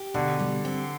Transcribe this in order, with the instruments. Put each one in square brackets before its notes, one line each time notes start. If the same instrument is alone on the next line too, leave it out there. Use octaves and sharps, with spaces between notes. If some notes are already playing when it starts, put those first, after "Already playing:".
Already playing: [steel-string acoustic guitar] G4
[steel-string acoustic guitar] B2 [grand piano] D3
[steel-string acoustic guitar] G3
C4